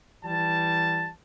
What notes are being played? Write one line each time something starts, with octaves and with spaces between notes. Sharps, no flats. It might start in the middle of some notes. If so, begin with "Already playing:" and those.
E3 G3 A5